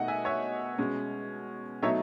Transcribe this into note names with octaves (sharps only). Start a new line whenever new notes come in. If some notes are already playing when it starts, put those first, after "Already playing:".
Already playing: B2 A3 D#4 D#5 F#5
E5 G#5
C#5 E5
B2 G#3 C#4
B2 F#3 A3 D#4 C#5 E5